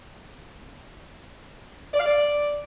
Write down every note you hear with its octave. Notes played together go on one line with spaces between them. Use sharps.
D5
F5
D5